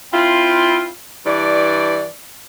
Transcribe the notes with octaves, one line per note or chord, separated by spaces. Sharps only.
C4 E4 F4
G2 E3 D4 D5